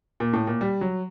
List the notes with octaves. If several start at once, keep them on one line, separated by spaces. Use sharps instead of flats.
A#2
A2
A#2
G3
F#3